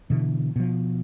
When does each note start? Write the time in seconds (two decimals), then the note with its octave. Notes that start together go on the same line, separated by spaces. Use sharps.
0.10 B2 D3 E3
0.56 B2 F3